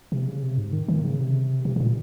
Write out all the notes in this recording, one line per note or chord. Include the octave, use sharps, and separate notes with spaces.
C3
C#3
C3
G#2
D#3
D#3
C#3
C3
C3
C3
A#2